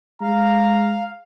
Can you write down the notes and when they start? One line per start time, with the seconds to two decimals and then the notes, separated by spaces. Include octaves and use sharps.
0.22 G#3 F5 A#5